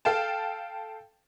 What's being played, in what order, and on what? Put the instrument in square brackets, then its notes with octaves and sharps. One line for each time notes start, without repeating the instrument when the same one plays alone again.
[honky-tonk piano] A4 F5 G5 A5